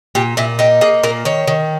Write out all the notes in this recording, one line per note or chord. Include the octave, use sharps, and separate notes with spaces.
A#2 G4
A#2 E4
D#4 G4
A#3 G#4
A#2 A#4
D#3 C#5
D#3